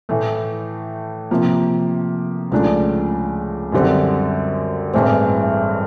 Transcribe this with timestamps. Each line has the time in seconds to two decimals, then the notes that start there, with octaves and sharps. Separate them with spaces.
0.09 A2 E3 A3
1.31 C3 F3 A#3
2.52 C#2 C#3 F3 A3 D4
3.72 F#2 D3 G3 C4
4.94 A1 G2 E3 G#3 C4